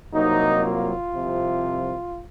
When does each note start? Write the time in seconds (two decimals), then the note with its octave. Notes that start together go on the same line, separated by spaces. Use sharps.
0.14 C2 C3 F#3 A#3 D#4
0.64 F4
1.14 C2 C3 F3